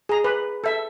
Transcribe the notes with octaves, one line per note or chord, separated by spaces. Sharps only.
G#4 A#5
B4
A4 E5